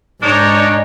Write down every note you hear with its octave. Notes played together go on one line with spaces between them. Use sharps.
G#2 D4 D#4 C#5 D5